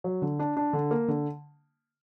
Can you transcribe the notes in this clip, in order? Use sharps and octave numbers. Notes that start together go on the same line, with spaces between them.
F#3
D3
D4
D4
D3
A#3
D3